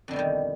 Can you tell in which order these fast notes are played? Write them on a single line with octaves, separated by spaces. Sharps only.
F2 D3 B2 G3 D#3